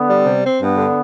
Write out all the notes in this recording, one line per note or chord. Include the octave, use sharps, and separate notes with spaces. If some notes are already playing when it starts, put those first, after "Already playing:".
Already playing: D3 B3
G3
C3
C4
G2 B3
D3